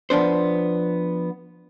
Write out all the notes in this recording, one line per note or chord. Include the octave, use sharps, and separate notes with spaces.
F3 B3 D4 C5